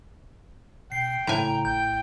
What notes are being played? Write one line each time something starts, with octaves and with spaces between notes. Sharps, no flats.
B2 G5 C7
A2 C#3 G#5 A#5
G#1 G5 G6